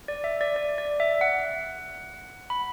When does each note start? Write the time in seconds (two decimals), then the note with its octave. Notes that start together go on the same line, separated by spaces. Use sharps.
0.08 D5
0.24 E5
0.41 D5
0.56 D5
0.78 D5
1.00 E5
1.21 F#5
2.50 B5